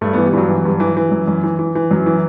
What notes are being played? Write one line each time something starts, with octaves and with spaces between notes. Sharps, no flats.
G2 A3
E3 B3
G3
G2 E3 F#3
E3
G2
E3
E3
F#2
F#2
E3
E3
E3
F#2 F#3
E3